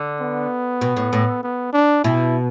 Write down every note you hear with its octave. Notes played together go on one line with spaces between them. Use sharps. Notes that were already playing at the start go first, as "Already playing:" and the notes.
Already playing: D3
B3
B2
A2
A2
B3
D4
B2 E4